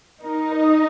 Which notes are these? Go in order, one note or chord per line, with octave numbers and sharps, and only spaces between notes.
D#4 A#4
D#5